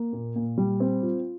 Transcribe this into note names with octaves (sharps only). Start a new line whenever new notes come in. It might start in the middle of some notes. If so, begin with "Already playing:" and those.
Already playing: A#3
A#2
A#2
G3
C4
F4